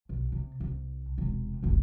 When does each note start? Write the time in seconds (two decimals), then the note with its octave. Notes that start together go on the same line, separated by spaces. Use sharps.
0.09 B1
0.32 C3
0.60 C2
1.18 E1 C3
1.63 F1 B1